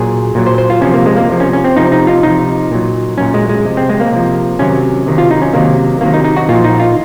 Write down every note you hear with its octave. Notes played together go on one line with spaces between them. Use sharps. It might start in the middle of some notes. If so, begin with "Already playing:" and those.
Already playing: A#2 F#3 G#4
A#2 F#3
C5
C5
F4
C3 F3 C#4
A#3
G#3
A#3
C3 F3
C#4
C#4
C4
C3 F3 D#4
D#4
F4
C3 F3 D#4
A#2 F#3
A#2 F#3 C#4
G#3
G#3
C3 F3
C4
G#3
A#3
C3 F3
C3 D#3 F#3 C#4
C3 D#3 F#3
F4
D#4
C#4
C3 D#3 F#3 A#3
C3 D#3 F#3 A#3
D#4
D#4
F#4
A#2 F3 F4
D#4
F4